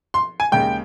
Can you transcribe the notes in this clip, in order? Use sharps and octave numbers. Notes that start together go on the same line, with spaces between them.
C6
G#5
D#2 C#3 G#3 G5